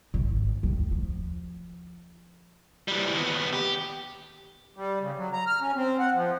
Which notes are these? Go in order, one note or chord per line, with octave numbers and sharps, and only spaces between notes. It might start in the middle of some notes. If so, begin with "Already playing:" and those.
G#1
D#2 D#3
F3
E3 G3
D#2 B3
G4
G3
C#3
F#3
A#5
F6
C#4
C4
F#5
F3